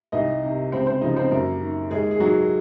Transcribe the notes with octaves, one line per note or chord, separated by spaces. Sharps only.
C2 D#4 D#5
C3 D#3
C#2 C4 C5
C4 C5
C#3 F3 D#4 D#5
C4 C5
F#2 A#3 A#4
D#3
D#2 G#3 G#4
G#4
D#3 F#3 F#4